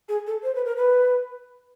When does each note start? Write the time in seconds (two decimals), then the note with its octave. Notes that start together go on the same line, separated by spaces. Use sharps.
0.09 G#4
0.27 A4
0.43 C5
0.55 B4
0.65 A#4
0.76 B4